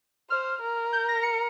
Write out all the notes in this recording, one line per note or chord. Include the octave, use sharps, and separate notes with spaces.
C5 F6
A#4
G6
A#6
C#7